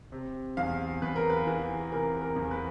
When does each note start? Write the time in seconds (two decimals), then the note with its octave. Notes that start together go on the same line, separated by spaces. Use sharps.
0.12 C3
0.57 E2 F5
1.02 E2 B4
1.16 A#4
1.30 B4
1.46 E3 B4
1.92 C3 A#4
2.21 A#4
2.36 E2
2.51 B4